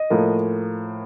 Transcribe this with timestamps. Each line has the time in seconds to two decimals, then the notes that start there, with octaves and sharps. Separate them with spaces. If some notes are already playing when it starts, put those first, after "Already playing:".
Already playing: D#5
0.10 A2 F3 A#3